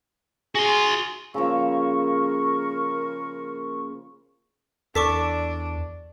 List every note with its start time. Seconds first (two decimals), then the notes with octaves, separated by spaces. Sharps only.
0.55 F#4 G#4 C6
1.34 C#3 F3 A#3 A#4 A#5 C#6 E6
4.95 E2 D4 A4 C#6 D6 B6